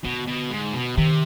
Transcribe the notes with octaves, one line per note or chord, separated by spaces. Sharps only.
B2 D3
B2
G#2
B2
C3 D#3